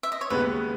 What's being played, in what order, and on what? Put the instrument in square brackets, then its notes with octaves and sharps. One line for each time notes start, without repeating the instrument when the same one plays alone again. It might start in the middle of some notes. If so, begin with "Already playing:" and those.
[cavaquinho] E5
D#5
C#5
[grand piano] D#2 C#3 G#3 B3 [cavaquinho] B4